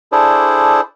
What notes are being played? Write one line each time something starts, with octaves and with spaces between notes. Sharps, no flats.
D4 E4 G#4 A4 C5 D5